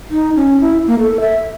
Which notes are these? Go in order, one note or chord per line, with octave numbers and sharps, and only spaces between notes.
D#4
C#4
E4
A#3
A4
E5